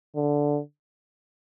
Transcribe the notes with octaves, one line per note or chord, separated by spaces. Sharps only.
D3